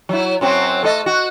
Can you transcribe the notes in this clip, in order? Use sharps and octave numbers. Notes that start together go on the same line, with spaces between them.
F#3 E4
F#2 F#3 C4
A3 A4 D#5
F#4